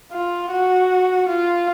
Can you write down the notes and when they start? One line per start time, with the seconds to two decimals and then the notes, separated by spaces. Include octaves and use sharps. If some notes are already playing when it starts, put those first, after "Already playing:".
0.13 F4
0.51 F#4
1.29 F4